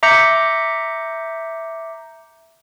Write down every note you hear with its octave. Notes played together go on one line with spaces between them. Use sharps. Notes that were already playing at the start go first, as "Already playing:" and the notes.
E5 A#5 D6 G6 A#6 C#7